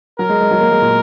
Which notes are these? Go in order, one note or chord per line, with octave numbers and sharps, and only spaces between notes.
F#3 A#4
G#3
G#3
F#3
A#3
G#3
A#2